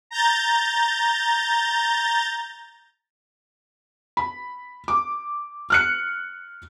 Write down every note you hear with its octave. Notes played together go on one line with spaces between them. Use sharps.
A#5 G6 A6
B5
D6
F6 F#6 C#7